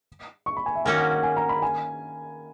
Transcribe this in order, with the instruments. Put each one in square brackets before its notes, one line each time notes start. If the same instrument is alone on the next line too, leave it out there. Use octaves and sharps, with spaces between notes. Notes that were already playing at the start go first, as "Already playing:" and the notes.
[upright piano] C#6
B5
G#5
E5
[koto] D#3 A#3 C#4 F#4 [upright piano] G#5
[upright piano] F#5
F#5
G#5
A#5
B5
G#5